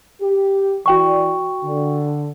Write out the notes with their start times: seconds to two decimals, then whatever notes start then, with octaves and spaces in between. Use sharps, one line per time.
0.21 G4
0.86 E3 F#4 D5 G5 C#6
1.64 D3